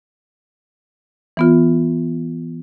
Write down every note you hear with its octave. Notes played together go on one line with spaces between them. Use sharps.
E3 B3 F4